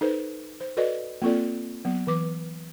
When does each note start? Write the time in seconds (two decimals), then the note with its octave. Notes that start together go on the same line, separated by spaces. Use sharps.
0.01 D#4 A4 B4 C5
0.61 C5
0.77 F#4 A4 B4 D5 D#5
1.22 A#3 C4 F4 A4 D5
1.85 F#3 B3
2.07 E3 B4 D6